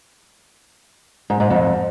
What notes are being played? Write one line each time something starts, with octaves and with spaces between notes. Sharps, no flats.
G#2
G#2
F2